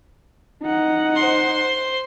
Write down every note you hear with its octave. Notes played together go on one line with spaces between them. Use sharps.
D#4 F#5
C5 C6